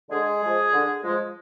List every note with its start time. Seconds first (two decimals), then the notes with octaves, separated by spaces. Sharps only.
0.10 D3 G#3 G#4
0.42 F3 G#3
0.73 D3
1.04 F3 G#3